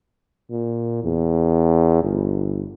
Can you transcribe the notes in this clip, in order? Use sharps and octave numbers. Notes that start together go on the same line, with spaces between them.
A#2
E2
G1